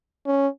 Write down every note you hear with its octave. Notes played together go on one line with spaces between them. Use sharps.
C#4